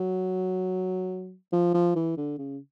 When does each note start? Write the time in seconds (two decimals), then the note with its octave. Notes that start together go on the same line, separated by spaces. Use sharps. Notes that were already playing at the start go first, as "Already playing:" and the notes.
Already playing: F#3
1.52 F3
1.74 F3
1.96 E3
2.17 D3
2.38 C#3